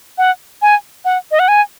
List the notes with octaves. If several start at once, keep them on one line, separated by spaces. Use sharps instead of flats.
F#5
G#5
F#5
D#5
F#5
G#5